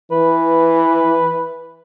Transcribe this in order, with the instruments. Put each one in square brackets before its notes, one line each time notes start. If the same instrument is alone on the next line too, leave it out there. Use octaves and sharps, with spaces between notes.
[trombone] E3 [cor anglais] B4